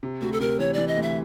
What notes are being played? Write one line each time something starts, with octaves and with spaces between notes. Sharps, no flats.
C3
D2 F#4
A4
C3 A#4
E3 C#5
E3 D5
D#5
D2
E5